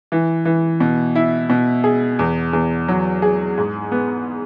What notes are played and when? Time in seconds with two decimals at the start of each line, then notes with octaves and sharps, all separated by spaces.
0.12 E3
0.45 E3
0.80 B2
1.15 E4
1.50 B2
1.84 G#4
2.19 E2
2.53 E2
2.88 F#3
3.22 G#4
3.58 G#2
3.92 B3